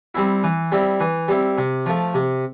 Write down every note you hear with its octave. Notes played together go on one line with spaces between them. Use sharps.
G3 C4 E4
E3
G3 C4 E4
E3
G3 C4 E4
C3
F3 A3
C3